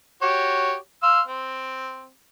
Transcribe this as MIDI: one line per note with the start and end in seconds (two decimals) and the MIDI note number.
0.22 0.75 66
0.22 0.75 67
0.22 0.75 73
1.03 1.21 77
1.03 1.21 84
1.03 1.21 88
1.27 2.09 60